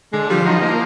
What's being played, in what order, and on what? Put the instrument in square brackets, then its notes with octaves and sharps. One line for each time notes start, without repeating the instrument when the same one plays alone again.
[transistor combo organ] D3 [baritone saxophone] G#3
[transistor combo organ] F3 [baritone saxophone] G3
[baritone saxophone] F#3 [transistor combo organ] D#4
[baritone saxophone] E3
[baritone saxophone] F3 [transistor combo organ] A#3